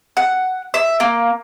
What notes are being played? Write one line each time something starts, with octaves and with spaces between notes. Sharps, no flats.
F#5
E5
A#3